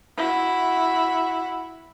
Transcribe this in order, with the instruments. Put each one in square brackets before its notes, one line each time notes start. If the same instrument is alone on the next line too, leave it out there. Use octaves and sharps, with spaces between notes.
[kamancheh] E4 F#4